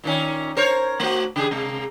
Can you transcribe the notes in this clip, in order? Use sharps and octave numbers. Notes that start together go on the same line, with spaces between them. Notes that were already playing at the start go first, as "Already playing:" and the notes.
A#2 D#3 C#4
A#4 C5 C#5
A3 F#4
C#3 G4 G#4
C3 G#3 A#3